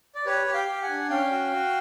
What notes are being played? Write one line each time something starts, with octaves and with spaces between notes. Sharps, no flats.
D5
G4 B4 C#5
G4
F5 G5
G4
F#5 G#5
D4
C#4 F5 G5
F#4
F#4